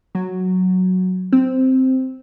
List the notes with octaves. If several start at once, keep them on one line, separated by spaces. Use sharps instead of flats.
F#3
C4